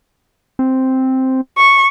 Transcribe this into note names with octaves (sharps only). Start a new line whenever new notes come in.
C4
C#6